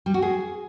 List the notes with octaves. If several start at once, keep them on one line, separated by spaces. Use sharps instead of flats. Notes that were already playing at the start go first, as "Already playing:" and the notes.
G3
F#4
G#4